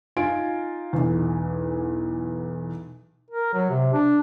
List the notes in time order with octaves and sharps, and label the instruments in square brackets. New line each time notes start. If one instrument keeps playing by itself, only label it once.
[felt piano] D#4 F4 G#5 D7
B1 E2
[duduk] A#4
F#3
C3
D4